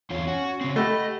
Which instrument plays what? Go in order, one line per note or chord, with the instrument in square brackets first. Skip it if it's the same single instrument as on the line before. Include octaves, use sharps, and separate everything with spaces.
[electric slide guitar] E2 F4 [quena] C#5
[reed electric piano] C#4 [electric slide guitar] F#4
[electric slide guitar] C#3 C4
[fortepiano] A3 [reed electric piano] G4 F#5 [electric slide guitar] D#5 [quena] B5